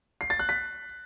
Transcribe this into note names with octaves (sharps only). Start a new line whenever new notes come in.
C7
A6
F#6
B6